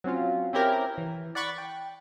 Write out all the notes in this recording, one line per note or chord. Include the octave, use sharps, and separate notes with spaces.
F#3 C4 C#4 F4
C4 C#4 E4 G4 A#4
E3
D5 F#5 B5 C#6 A6
G5